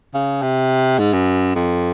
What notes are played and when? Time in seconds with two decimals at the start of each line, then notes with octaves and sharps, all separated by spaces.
0.14 C#3
0.42 C3
0.99 G#2
1.13 F#2
1.56 F2